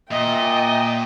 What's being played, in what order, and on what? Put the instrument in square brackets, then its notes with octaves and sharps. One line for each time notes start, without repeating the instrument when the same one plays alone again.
[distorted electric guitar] A#2 [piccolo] D#5 [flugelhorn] E5 [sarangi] G5